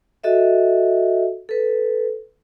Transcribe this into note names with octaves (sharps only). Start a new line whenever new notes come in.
F#4 A4 D#5 E5
A4 B4